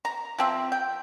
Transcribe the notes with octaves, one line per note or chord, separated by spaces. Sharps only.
A#5
F3 C4 E5
G5